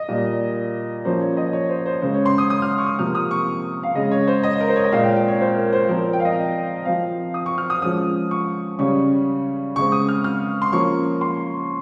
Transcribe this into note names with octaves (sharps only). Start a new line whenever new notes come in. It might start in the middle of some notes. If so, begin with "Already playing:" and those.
Already playing: D#5
A#2 G3 A#3
F3 A#3 C#4 C5
C#5
D#5
C#5
C5
C5
C#3 G#3 C#4 C5
C#5
C6
D#6
D#6
F6
C#6
D#6
C3 F3 A#3 F6
D#6
C#6
F5
C#3 G#3 C#4 D#5
C#5
C5
D#5
A#4
C5
C#5
D#5
A#2 G#3 C4 F5
G5
G5
C#5
C5
A#4
C#5
C5
F3 C4 A#4
G5
F5
D#5
F3 C4 F5
D#6
C#6
F6
D#6
F3 G#3 C#4 D#6
C#6
C#3 G3 C#4 C#6
C#3 G#3 C4 C#6
D#6
F6
F6
C6
F3 A#3 C#4 C#6
C6